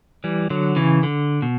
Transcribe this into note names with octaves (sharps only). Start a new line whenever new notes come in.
E3 G3
D3 F#3
C#3 E3
D3
B2